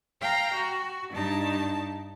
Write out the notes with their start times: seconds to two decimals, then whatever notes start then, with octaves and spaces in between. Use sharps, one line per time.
0.21 F5 G5 A#5
0.54 F#4
1.11 G2 D4 D#4 A5